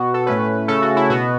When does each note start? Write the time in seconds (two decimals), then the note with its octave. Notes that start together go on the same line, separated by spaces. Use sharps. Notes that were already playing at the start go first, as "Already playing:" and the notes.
Already playing: B2 B3 F#4
0.14 A4
0.27 A2 A3 C#4 B4
0.68 C#3 A3 C#4 A4
0.82 F#4
0.96 E4
1.10 B2 B3 F#4